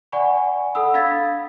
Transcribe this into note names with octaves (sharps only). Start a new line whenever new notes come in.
D5 F#5 G#5 B5 C#6
A4 F#5 B5 D#6 E6
D4 F5 B5 G#6 A6 B6